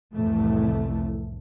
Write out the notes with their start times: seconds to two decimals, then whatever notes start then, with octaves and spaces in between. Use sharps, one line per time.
0.13 C2 F2 A2 E3 A3